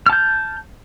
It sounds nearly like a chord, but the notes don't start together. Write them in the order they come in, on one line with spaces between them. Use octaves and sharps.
F6 A5 G6